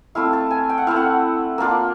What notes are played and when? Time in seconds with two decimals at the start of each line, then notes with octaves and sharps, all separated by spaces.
0.15 A3 C4 E4 F5
0.33 A5
0.51 G#5
0.69 G5
0.78 F#5
0.87 A3 C4 E4 F5
0.96 F#5
1.58 A#3 D4 F4